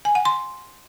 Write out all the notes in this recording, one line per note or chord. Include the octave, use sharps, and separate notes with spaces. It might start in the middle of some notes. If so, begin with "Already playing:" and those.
G#5
F#5
C6